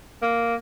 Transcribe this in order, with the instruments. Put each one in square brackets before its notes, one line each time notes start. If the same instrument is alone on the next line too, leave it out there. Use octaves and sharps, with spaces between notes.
[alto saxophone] A#3